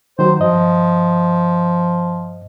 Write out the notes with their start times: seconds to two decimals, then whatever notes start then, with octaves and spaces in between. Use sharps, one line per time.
0.19 D#3 F#3 C5
0.40 G2 F3 D#5